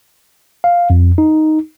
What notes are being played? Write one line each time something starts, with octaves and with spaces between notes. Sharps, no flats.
F5
F2
D#4